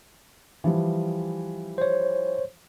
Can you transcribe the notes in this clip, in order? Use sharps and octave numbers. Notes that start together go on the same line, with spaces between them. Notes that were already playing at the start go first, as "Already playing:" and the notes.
E3 F3 G3
C5 C#5